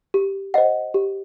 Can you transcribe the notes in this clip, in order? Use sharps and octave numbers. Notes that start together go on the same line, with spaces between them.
G4
C5 D#5 F#5
G4